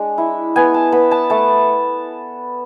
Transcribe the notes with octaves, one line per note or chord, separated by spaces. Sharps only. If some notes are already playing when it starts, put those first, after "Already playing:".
Already playing: G#3 D4
E4
B3 G#5
A5
B3 B5
A5
A3 A5